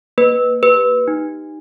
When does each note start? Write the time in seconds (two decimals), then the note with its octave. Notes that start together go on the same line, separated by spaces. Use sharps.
0.18 A#3 B4
0.63 G4 B4
1.08 D#4